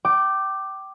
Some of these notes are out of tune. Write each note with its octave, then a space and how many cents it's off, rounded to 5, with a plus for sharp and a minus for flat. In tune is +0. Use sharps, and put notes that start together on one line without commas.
G5 -25 D6 +10